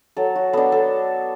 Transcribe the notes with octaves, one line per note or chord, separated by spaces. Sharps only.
F#3 A4
F#4
B3 D4 A4
A4